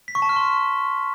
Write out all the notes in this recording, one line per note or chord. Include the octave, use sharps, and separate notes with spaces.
B6
C#6
A5
F6
C6